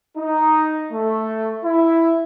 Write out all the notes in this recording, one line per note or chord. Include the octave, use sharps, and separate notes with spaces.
D#4
A3
E4